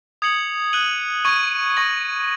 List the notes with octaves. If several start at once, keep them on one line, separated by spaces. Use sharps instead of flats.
D#6 G#6 C#7 F#7
F#6 D#7 F#7
C#6 G#6 D#7 F#7
C#6 A#6 F#7